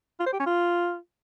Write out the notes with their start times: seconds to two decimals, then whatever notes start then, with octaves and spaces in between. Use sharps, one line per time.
0.20 F4
0.26 C5
0.33 G4
0.39 C#4
0.46 F4